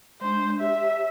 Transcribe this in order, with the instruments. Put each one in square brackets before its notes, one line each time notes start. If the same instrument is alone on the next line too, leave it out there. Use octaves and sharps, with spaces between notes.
[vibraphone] G#3 D4 [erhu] C5
[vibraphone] G4 C#5 [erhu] E5